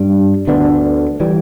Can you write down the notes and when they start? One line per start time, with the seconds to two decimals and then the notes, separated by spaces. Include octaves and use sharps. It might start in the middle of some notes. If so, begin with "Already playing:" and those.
Already playing: G2 G3 D4
0.47 D2 D3 B3 D4
1.20 E3 G3